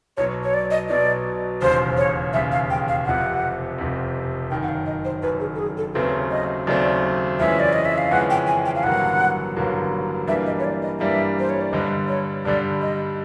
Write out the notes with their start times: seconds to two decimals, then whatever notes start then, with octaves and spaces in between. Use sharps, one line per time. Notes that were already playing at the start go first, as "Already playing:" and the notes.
0.17 B1 B2 F#3 C#5
0.44 C#5
0.54 D5
0.71 D#5
0.89 B1 B2 F#3 D5
1.62 E1 D#2 C#3 C5
1.97 C#5
2.33 E1 D#2 C#3 E5
2.52 F5
2.70 G5
2.88 F5
3.06 F1 F2 C3 F#5
3.78 F1 F2 C3
4.50 F#1 F#2 D#3 G5
4.63 F#5
4.69 F5
4.86 D#5
5.05 C5
5.22 F#1 F#2 D#3 B4
5.40 G#4
5.55 A4
5.59 G#4
5.77 A4
5.94 D#2 C#3 F#3 A3 C4 B4
6.31 D#5
6.67 D#2 C#3 F#3 A3 C4 D5
7.40 F2 C#3 E3 G#3 C#4 E5
7.60 D5
7.73 D#5
7.85 E5
7.98 F5
8.11 F2 C#3 E3 G#3 C#4 F#5
8.30 G5
8.47 G#5
8.65 G5
8.75 F5
8.83 A1 G2 D3 F#3 A#3 F#5
9.56 A1 G2 D3 F#3 A#3
10.27 G2 E3 G3 A#3 D4 E5
10.46 D#5
10.59 C#5
10.64 D5
10.82 D#5
11.00 G2 E3 G3 A#3 D4 E5
11.39 C5
11.50 C#5
11.61 D5
11.72 G2 D3 G3 D#5
12.08 C#5
12.45 G2 D3 G3 D5
12.81 D#5